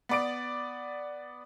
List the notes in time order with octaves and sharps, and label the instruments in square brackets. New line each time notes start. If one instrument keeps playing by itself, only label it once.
[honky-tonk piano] B3 D5 D7